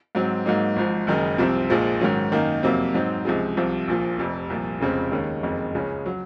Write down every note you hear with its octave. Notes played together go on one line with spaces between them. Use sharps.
G#2 F#3 C4
G#2 F#3 A#3 D#4
G#1 G#2 F3
F#1 F#2 D#3 G#3 D#4
C2 C3 F3 C4
A#1 A#2 F3 G#3
G#2 D#3 F#3 C#4
F#2 D#3 A#3 D#4
F2 C3 F#3 A#3
G#2 F#3 C4 D#4
C#2 C3 F3 G#3
C2 C3 F3
A#1 A#2 F3
F1 F2 C3
C2 A#2 F3
F1 F2 C#3 G#3 C4
D#2 D#3 G#3 C#4
F#1 F2 D#3 G#3
C#2 C#3 G#3 C#4
F#3